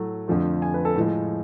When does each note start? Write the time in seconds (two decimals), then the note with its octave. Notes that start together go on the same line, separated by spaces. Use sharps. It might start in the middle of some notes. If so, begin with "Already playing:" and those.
Already playing: A2 F#3 A3
0.28 F2 D3 F3 A3
0.62 G#5
0.74 B4
0.85 A4
0.96 A2 F3 G#3